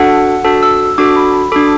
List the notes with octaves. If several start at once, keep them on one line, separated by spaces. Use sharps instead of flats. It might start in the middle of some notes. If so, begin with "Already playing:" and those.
Already playing: D4 F#4 A4 F#5
D4 F#4 A4 A5
E6
E6
D4 F#4 A4 D6
B5
B5
D4 F#4 A4 D6